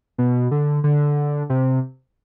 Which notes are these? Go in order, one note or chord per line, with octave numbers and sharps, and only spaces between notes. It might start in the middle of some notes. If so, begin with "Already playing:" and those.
B2
D3
D3
C3